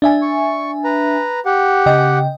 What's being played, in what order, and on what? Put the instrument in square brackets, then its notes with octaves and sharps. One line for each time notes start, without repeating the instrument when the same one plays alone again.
[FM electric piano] D4 E5 G#5
[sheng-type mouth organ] C#6
B4 A#5
G4 F#5
[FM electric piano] C#3 D#5 G5